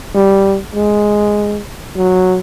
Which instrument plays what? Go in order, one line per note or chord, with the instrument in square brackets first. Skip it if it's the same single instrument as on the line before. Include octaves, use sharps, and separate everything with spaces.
[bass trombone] G3
G#3
F#3